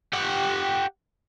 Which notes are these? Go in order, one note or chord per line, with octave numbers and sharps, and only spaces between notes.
G4 F#5